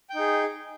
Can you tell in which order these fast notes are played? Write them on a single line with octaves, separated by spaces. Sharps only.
G5 D#4 G#4